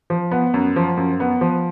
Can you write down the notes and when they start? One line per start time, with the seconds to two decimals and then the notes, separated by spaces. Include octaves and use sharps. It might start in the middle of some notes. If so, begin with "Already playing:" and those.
0.10 F3
0.31 B3
0.54 F#2
0.76 F3
0.97 F#2
1.20 B3
1.41 F3